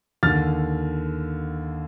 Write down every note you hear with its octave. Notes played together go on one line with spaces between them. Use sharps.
D#2 D3 F6 A6